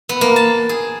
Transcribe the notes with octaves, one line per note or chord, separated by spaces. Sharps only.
B3
A#3
A5
G#4